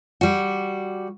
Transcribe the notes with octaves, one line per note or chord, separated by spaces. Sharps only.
G3 F#4